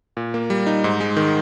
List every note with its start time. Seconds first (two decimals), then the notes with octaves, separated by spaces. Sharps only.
0.17 A#2
0.34 A#3
0.50 G3
0.66 D#4
0.84 G#2
1.01 G#3
1.17 D#3